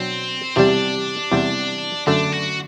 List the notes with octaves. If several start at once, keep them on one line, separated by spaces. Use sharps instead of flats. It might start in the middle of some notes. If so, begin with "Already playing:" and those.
Already playing: B2 F#3 C4 D4 F#4
E2 C3 G3 D4
E2 C3 G3
F#2 D3 A3 D4
F#4